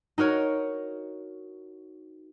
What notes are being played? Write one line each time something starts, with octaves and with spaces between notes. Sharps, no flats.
D#4 F#4 A#4 C#5